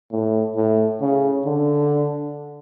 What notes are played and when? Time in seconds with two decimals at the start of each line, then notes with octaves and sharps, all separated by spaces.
0.12 A2
0.56 A2
1.01 C#3
1.45 D3